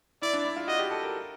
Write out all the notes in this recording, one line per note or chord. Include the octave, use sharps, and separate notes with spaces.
E4 D5
D4
E4
F4
F#4 D#5
G4
A4
A#4